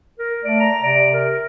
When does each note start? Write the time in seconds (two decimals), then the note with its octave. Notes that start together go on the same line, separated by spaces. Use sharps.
0.19 A#4
0.44 A3 D5
0.60 A#5
0.83 C3 D5
1.13 A#4